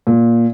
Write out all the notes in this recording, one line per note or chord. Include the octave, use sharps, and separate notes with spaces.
A#2